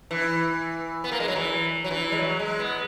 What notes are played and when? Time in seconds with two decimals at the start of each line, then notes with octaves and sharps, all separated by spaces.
0.11 E3
1.04 B3
1.12 A#3
1.20 G#3
1.28 F#3
1.35 E3
1.84 F#3
1.91 E3
2.12 G#3
2.18 F#3
2.39 G#3
2.59 B3